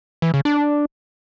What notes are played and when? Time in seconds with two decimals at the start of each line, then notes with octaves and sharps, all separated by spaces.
0.22 E3
0.34 C#3
0.45 D4